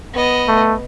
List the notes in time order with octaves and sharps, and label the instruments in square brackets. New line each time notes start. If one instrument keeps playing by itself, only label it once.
[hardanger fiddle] B3 D#5
[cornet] A3